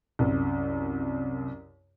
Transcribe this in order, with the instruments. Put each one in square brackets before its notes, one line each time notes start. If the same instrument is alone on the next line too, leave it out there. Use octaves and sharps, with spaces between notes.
[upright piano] C2 F#2